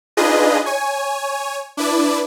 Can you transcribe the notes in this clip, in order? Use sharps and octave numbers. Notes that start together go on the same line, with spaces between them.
D4 D#4 F4 G#4 B4 D#5
C#5 G#5
D4 E4 B4 D5